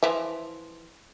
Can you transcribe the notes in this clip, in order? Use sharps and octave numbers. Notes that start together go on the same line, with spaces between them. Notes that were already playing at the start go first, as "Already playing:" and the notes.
E3 F3 E5